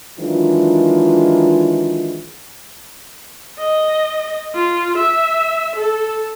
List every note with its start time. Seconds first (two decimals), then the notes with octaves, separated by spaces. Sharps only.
0.19 D#3 E3 F#3 G#3 D4 F4
3.59 D#5
4.55 F4
4.98 E5
5.76 A4